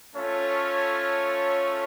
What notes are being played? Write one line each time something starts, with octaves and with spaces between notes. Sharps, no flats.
A3 C#4 F4 A4 C#5